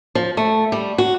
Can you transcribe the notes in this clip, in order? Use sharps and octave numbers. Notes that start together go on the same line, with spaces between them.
F3
A3
G3
F#4